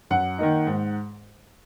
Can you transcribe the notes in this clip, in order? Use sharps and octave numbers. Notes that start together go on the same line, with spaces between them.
F#2 F#5
D#3 A#3 D#4
G#2